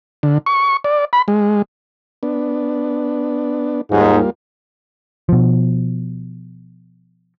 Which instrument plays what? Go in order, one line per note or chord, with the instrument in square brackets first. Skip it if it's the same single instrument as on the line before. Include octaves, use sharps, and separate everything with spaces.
[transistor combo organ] D3
C#6
D5
B5
G#3
B3 D4
[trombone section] D#2 G#2 [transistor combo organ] G3 A#3 F4
[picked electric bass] B2 F3